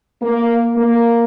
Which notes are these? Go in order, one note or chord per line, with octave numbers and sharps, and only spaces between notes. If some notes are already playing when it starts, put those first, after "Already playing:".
A#3
A#3